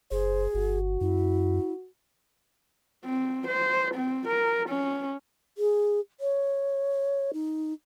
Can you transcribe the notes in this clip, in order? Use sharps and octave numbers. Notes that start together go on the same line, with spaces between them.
F#1 G#4 C5
G1 F#4
F#2 E4
C4
C5
C4
A#4
C#4
G#4
C#5
D#4